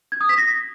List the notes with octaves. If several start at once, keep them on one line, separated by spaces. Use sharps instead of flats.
G#6
D#6
B6
A#6